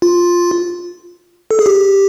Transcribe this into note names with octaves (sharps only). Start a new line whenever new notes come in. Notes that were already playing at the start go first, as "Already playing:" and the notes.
F4
A4
G#4
G4